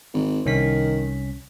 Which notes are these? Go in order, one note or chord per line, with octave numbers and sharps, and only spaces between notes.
G#1
C2 D#3 C#4 B6